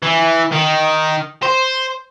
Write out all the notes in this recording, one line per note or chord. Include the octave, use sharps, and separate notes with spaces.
E3
D#3
C5